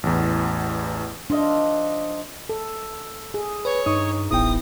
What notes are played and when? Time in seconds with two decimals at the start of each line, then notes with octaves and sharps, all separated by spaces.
0.03 A1 E2
1.30 F3 D4 D#5 E5
2.49 A4
3.34 G#4
3.65 B4 C#5
3.86 G2 D#4 C#6 D#6
4.31 D1 A1 B3 E4 G5 D#6